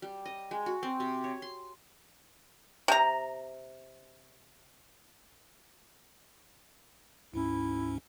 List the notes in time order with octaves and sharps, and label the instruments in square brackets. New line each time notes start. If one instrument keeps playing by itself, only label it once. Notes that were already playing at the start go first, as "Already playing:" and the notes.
[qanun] G3
D#5
G#3
F#4
C4
C3
C#5
C6
[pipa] C3 A#5
[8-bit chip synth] D2 G#2 C#4 [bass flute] E4